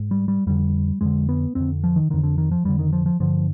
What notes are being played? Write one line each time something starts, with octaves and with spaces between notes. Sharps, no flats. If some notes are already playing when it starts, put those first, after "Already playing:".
Already playing: G#2
G3
G3
F2 D3 G3
F2 D3 G#3
B3
F2 D3 C4
F3
D#3
F2 D3 D#3
D3
D#3
F3
F2 D3 G3
D#3
F3
F3
G2 D3 F3